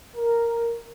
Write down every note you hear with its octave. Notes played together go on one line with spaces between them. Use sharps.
A#4